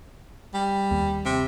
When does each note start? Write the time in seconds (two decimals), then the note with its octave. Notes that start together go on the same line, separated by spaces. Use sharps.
0.54 G3
0.91 D#2
1.25 C3